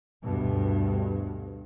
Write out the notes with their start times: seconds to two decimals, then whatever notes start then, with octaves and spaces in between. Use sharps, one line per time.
0.23 D2 G2 B2